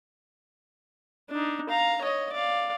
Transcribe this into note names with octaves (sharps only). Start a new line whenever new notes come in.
D4 D#4
F5 A#5
C#5 D#5
D5 F5